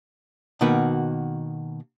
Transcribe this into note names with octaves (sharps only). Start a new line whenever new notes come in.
B2 D#3 A#3 F#4 B4